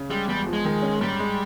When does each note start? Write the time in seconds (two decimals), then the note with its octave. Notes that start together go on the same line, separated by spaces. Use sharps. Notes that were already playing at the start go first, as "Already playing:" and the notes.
Already playing: C#3
0.10 G3 G#3
0.28 E2 G3
0.47 F3
0.53 G#3
0.65 D#3
0.83 C#4
1.01 G#2 G3
1.19 G#3